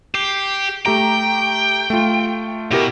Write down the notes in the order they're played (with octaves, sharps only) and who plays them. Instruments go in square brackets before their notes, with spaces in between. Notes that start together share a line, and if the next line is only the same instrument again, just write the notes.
[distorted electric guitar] G4 [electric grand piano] C7
[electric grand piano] A3 G4 A#5 [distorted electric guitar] G5
[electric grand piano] A3 F4
[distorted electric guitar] B2 [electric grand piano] E4 G4 A#4